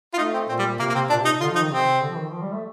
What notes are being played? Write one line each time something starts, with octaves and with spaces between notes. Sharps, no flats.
F4
A3 D#4
C4
A#2 C4
G3
C3 A#3
A#3
C3 C4
A#2 D4
C3 D#4
D3 F4
F3 D#4
D#3
C3 C4
D3
F3
D#3
F3
G3
A3